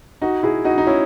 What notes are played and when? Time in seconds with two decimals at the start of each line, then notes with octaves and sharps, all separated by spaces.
0.21 D#4 F#4
0.43 E4 G#4
0.65 D#4 F#4
0.78 D#4
0.87 C#4 E4